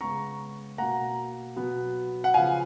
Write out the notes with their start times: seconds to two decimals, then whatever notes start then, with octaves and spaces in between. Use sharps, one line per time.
0.01 C#3 G#3 B3 A#5 C#6
0.78 B2 A#3 F#5 A#5
1.56 B2 F#3 B3
2.24 F#5
2.34 C#3 F3 B3 F5 G#5